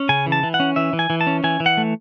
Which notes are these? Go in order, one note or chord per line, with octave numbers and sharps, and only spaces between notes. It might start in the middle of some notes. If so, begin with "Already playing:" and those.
Already playing: C#4
C#3 G#5
E3
A5
E3
F#5
C#4
E3 E5
E3
G#5
E3
A5
C#4
E3 G#5
E3
F#5
A3